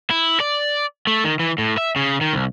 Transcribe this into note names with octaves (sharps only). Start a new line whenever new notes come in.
E4
D5
A3
D#3
E3
A2
E5
C#3
D#3
C2